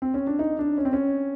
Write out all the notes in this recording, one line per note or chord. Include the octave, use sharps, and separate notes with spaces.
C4
C#4
D4
D#4
D4
C#4
C4
C#4